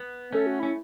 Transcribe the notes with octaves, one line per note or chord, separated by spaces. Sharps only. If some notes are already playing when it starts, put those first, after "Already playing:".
Already playing: B3
A3 C#4 A4
F#4
C#4 E4